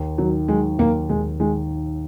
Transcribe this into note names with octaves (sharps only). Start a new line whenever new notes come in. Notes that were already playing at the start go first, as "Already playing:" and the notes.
Already playing: D#2
D#3 F#3
F#3 G#3
D#2 A#3
D#2 G#3
D#3 G#3